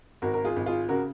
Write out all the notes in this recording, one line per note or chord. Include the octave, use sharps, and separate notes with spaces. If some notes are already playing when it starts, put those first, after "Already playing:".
G#1 F#4 A#4
A#4
F4 G#4
G#1
F4 G#4
C#3 F#4 A#4